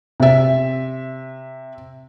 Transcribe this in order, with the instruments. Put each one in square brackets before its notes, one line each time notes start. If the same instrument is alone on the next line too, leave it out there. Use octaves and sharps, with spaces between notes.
[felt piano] C3 E5